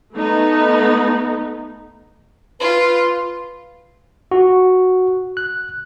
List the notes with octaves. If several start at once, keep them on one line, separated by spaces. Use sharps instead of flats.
A3 B3 D#4
F4 B4
F#4
F#6